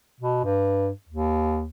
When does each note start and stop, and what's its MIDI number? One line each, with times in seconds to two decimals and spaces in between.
0.20 0.39 47
0.44 0.90 43
1.09 1.69 39